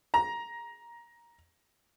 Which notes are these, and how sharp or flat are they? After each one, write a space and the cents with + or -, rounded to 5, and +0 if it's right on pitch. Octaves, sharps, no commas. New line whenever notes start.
A#5 +15